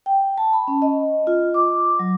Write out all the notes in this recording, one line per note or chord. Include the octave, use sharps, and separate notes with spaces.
G5
A5
B5
C#4
D#5
F4
D6
F#3